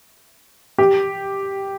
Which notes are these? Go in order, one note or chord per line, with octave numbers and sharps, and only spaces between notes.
G4